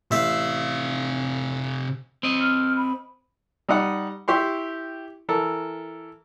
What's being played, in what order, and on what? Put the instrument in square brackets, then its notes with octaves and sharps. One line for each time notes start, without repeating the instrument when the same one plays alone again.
[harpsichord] A1 E5 [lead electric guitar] C3 F5
[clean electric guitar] C4 D#5
[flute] F6
B5
[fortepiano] G3 D#4 D#5 F#5
E4 G4 C6 C#6
E3 A4 A#4